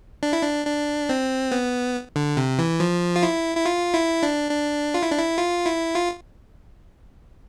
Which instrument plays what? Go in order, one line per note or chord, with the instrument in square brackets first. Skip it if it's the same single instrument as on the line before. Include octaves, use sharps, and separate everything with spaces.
[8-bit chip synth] D4
E4
D4
D4
C4
B3
D3
C3
E3
F3
F4
E4
E4
F4
E4
D4
D4
F4
E4
D4
E4
F4
E4
F4